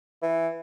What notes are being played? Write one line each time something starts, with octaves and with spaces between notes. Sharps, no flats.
E3